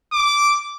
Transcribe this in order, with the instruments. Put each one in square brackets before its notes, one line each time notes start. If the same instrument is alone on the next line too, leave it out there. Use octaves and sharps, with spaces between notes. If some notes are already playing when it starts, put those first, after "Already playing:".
[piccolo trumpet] D6